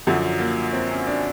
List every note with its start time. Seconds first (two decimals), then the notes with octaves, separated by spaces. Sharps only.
0.07 F#2 D3 F3 F#3
0.40 A#3
0.73 C4
0.91 C#4
1.07 D4